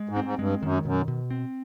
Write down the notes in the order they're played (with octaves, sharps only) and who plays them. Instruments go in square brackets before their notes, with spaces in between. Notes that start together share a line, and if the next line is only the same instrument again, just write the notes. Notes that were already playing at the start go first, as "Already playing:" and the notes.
Already playing: [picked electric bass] G#3
[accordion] G#2
[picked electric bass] C4
[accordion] G#2
[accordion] G2 [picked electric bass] G#3
[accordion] F#2 [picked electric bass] D#3
[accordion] F#2 [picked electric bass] B2
[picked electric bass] B2
C4